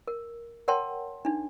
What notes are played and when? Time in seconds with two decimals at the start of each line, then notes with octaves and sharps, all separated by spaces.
0.08 A#4
0.68 A#4 C#5 F#5 G5 A5 C6
1.25 D4 D#4